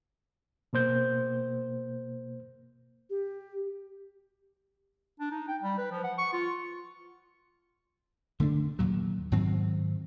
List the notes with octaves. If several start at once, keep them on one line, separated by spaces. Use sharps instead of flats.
B2 A#3 C5 G6
G4
D4
D#4
G5
G3
B4
F3
F#5
C#6
F4
D3 A3 B3 D4
D#2 A#2 F#3
G#2 D#3 F#3 C4